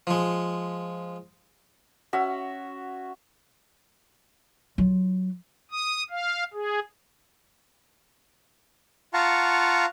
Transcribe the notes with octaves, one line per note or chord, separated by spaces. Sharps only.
F3 G#3
C#4 F#4 E5
F#3 F4
D#6
F5
G#4
F4 F5 F#5 A5 A#5 C#6